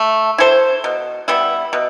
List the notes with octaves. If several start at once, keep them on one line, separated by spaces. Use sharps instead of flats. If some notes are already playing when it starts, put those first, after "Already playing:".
Already playing: A3
E4 A4 C5
B2
G3 B3 E4
B2